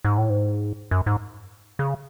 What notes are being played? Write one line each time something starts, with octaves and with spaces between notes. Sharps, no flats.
G#2
A2
G#2
F#2
G#2
C#3